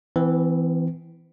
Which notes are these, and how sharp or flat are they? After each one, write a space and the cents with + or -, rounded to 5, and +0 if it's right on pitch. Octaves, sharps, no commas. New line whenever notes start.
E3 +0 C4 -40